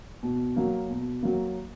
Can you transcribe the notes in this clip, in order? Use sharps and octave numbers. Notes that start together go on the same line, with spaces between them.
B2
F#3 A#3
B2
F#3 A#3